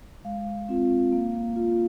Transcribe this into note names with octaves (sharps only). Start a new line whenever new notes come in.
G#3 F5
C4 F4
A#3 F5
F4